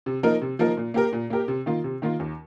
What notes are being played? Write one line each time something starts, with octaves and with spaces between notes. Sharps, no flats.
C3
F3 A#3 D#4 A#4
C3
F3 A#3 D#4 A#4
A#2
A#3 G4 A#4
A#2
A#3 G4 A#4
C3
D#3 A#3 F4
C3
D#3 A#3 F4
D#2